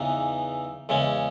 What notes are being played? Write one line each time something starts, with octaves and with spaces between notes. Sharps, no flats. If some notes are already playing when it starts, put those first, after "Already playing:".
Already playing: E2 C#3 E3 B3 D#4
E2 C#3 G#3 C#4